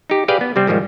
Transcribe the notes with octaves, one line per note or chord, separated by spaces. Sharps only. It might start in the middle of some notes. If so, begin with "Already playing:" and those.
D#4 G4
G4 G#4 B4 D5 F5 G5
B3
C3 G3 C4
G#2 D#3 F3 G3 G#3